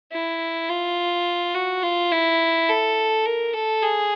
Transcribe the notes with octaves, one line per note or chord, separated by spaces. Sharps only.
E4
F4
F#4
F4
E4
A4
A#4
A4
G#4